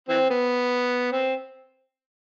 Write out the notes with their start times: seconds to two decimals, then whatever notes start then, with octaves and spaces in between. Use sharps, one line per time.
0.09 E3 C4
0.30 B3
1.12 C4